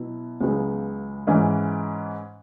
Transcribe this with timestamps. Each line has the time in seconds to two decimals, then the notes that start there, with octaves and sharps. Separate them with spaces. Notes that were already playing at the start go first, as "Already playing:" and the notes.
Already playing: B2 F#3 E4
0.41 C#2 C#3 F#3 B3
1.27 G#2 E3 C#4